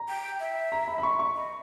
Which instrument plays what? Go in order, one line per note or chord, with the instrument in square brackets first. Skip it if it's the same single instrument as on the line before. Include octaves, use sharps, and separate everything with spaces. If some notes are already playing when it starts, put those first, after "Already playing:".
Already playing: [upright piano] A#5
[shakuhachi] G5
E5
[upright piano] A#5
B5
B5
C#6
C#6
[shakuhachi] D#5